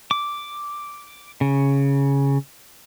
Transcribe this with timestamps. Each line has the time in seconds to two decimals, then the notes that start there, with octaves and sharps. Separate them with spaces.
0.11 D6
1.41 C#3